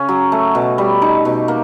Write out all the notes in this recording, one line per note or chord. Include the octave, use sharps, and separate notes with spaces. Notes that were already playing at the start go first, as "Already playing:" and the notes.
Already playing: C#3 C#4
F#3
A3
B2
G3
D#4
B2
A#3